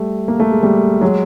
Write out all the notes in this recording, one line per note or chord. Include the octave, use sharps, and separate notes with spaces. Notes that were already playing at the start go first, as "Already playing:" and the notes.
Already playing: G3 A3
A#3
A3
G#3
G3 A3
F#3 G#3